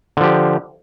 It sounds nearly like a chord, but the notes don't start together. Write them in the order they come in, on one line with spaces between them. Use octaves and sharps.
D3 F3 G4